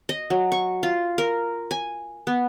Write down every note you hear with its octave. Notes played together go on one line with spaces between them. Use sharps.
D#5
F#3
C#6
F4
A#4
G#5
B3